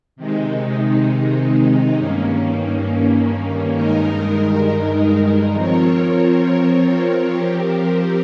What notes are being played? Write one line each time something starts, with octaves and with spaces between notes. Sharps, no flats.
C3 D#3 G#3 D#4
G2 D#3 A#3 C#4
G2 D#3 G#3 D#4 A#4
F3 C4 F4 A#4 C#5
F3 C4 G4 A#4